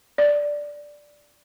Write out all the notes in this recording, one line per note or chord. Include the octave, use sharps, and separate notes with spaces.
D5